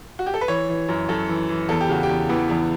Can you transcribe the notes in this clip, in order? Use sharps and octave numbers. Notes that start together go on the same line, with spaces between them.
F#4
G4
A4
B4
E3 C#5
E3
F#2
F#2 A4
E3
E3
E2 A4
G4
C#3 F#4
G4
E2
E3 B3
E2